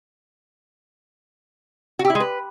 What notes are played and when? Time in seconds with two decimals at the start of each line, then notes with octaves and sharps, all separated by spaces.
1.99 F#4
2.05 G4
2.10 E4
2.15 G#3
2.20 B4